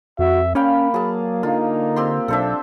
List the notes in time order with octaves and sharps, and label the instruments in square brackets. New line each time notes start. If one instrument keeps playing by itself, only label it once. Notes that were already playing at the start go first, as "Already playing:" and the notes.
[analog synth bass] F2 [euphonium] F#4 [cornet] E5
[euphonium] A#3 [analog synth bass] C#4 [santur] D5 F5 G5 [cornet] B5
[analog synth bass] F#3 [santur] G#4 A5
[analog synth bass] D3 [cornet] D#4 [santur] F4
[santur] C4 G4 C6
[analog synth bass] B1 [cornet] D4 [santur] A4 C5 E5